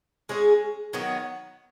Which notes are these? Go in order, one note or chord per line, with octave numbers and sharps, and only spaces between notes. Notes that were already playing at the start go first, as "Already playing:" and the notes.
G#3 C#4 G#4
D#3 F#3 B3